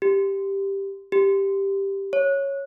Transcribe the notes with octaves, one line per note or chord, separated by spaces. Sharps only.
G4
G4
C#5